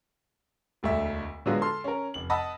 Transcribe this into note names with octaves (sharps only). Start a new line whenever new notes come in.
E1 D2 A3 E5
D3 F#3 G#3 B3 F4 F#4
A4 C6 F6
C#4 A#4
F1 F#7
D#5 F#5 A5 B5 D#6 E6